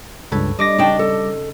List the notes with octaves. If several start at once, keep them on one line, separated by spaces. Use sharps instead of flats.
C#2 G2 A4 B4 C#5
G3 D4 D#5 D6 A#6
C#3 D4 D#4 G5 A5
A4